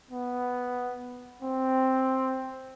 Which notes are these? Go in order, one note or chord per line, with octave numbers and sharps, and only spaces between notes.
B3
C4